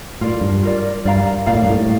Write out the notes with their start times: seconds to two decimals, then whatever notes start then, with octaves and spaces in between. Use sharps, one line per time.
0.21 A2 F4 A#4 D5
0.41 G2
0.63 F4 A#4 D5
1.05 G2 A#4 D5 F5 A#5
1.46 A#2 A#4 D5 F5 A#5
1.55 A2
1.63 G2
1.70 A2